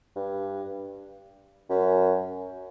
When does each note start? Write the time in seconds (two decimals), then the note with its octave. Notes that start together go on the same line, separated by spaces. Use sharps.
0.16 G2
1.69 F#2